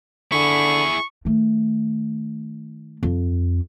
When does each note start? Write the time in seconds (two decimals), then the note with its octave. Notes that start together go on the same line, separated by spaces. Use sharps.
0.32 D3 E4 G#4 C#6
1.25 D#3 A3
3.03 F2